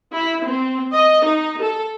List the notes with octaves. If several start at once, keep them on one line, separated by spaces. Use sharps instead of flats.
E4
C4
D#5
D#4
A4